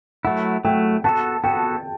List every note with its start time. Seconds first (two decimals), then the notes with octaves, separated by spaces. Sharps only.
0.25 F#3 A3 E4 F#5
0.65 F#3 A3 E4 G5
1.04 B3 F#4 A4 A5
1.44 B3 F#4 A4 G5